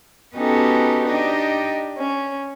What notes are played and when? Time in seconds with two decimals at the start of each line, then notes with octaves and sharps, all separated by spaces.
0.35 B3 C#4 D#4 F#4 G4 A4
1.05 D4 D#4 G4 D#5
1.98 C#4